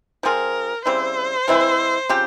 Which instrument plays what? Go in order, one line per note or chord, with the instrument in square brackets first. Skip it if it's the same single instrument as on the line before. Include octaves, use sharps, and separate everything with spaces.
[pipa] F3 C4 F4 G#4 [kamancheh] A#4
[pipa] C#3 G3 C4 E4 [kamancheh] C5
[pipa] E3 G#3 C4 E4
C#3 F3 C4 G4